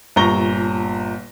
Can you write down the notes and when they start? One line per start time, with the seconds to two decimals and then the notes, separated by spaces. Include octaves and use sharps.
0.16 G1 A#2 A#5 C#6 A#6 G7